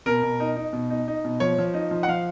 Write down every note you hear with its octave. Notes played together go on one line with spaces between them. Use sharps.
B2 A#4
B2
D#4
D#4
B2
D#4
D#4
B2
F3 C#5
F3
D#4
F3
F#5
F3 F5